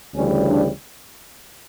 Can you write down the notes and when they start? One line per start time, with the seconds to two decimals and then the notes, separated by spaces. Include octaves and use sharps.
0.14 D2 C#3 E3 G3 C#4
0.49 D4